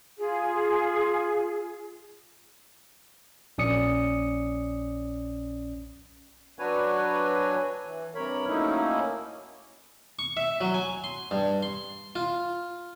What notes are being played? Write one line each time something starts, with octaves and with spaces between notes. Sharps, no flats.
F4 G#4
A#1 C#4 D5 D#6 C#7
F#3 D4 F#4 B4 C#5 G#5
E3
G2 C3 A#4 C#5 B5
F#3 A3 A#3 C#4 D#4 E4
C#6
E5
F#3
G#5
C6
G2
C6
F4